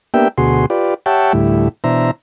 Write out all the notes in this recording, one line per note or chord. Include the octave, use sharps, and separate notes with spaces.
A#3 B3 D4 G4 E5 G5
D2 B2 F#4 G#4 C6
F4 G4 B4 D5
G4 C#5 E5 F#5 G5 A5
D2 A2 G3 E4
B2 E3 D4 C5 E5 A#5